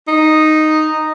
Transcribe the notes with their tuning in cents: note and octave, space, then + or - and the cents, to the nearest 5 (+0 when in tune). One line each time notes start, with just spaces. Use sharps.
D#4 -5